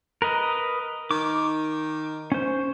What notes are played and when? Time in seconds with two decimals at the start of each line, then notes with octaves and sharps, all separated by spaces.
0.22 A#4 B4 D#5
1.11 D#3 D6
2.32 C#4 C5